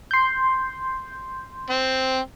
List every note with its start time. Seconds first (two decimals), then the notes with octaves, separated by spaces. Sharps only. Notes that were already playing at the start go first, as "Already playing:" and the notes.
0.11 C6 G6
1.70 C4